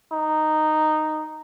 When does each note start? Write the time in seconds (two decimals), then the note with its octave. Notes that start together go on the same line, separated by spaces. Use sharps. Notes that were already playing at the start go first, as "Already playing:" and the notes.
0.12 D#4